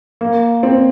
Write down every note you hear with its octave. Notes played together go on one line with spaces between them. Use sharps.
A#3
C4